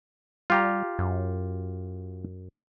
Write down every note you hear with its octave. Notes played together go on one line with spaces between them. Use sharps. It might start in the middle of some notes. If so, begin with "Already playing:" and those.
G3 F4 G4 A#5
F#2